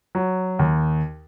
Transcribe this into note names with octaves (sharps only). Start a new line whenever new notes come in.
F#3
D#2